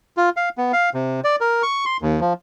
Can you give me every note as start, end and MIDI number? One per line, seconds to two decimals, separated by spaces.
0.17 0.29 65
0.37 0.49 77
0.58 0.72 59
0.73 0.90 77
0.94 1.20 48
1.24 1.36 74
1.41 1.62 70
1.63 1.85 85
1.86 1.97 84
2.02 2.20 39
2.20 2.33 53